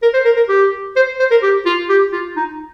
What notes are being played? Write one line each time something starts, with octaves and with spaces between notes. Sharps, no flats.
A#4
C5
A#4
A#4
G4
C5
C5
A#4
G4
F4
G4
F4
D#4